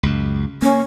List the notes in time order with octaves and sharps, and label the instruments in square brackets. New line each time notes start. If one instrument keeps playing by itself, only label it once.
[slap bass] C#2 F#2
[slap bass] A#3 [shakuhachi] C#4